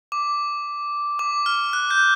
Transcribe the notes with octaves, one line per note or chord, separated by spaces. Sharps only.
D6
D6
F6
F#6
G6